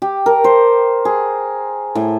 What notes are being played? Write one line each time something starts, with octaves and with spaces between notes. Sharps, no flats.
G4
A#4
C5
G#4
A2